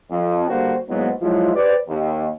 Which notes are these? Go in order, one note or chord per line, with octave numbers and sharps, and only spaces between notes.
F2
D3 G3 A#3 F#4 C5
E2 G#2 F#3 A#3 B3
F3 F#3 G#3 E4 F4
G4 B4 C5 D5
D#2